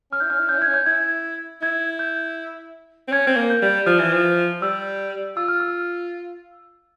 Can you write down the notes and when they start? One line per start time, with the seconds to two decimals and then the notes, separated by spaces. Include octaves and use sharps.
0.12 C#4 F6
0.20 E4 G6
0.30 C#4 F6
0.40 E4
0.49 C#4 G6
0.58 E4 G#6
0.68 C#4
0.74 G6
0.86 E4 G#6
1.62 E4 G#6
1.99 G6
3.08 C4
3.12 C#4 G#6
3.27 C4
3.37 A#3
3.50 G6
3.63 G3
3.86 F3 F6
3.99 E3
4.13 F3
4.62 G3 E6
5.37 F4 E6
5.48 F6
5.60 E6